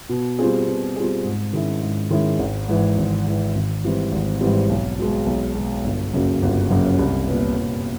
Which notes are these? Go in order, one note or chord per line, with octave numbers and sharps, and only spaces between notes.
B2
G3 C4 F4 G#4
B2
G3 C4 F4 G#4
G#2
D#3 G#3 C#4 E4
G#2
D#3 G#3 C#4 E4
G#1
G#2 E3
G#1
G#2 E3
G#1
G#2 E3 G3 C4
G#1
G#2 E3 G3 C4
B1
B2 G#3
B1
B2 G#3
G1
F#2 C#3 F#3 A#3
G1
F#2 C#3 F#3 A#3
C2
A#2 G3 B3
C2